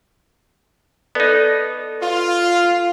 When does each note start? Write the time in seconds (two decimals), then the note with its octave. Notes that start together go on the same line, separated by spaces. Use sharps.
1.15 B3 D#4 A4 B4 D5
2.02 F4